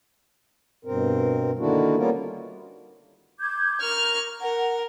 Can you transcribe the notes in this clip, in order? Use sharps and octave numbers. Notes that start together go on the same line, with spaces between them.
G2 B2 C4 A#4
D3 D#3 A#3 D4 E4 F#4
G3 A#3 B3 C#4 F4 A#4
D6 G6 G#6
A#4 C#6 F6
A#4 F#5